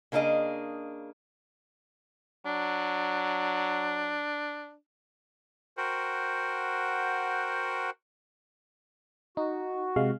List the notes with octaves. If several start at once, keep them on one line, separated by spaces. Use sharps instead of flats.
C#3 A#3 D4 G#4 D#5
F#3 D4
F#4 A#4 C5 F#5 G5
D#4 F#4
C3 G#3 F5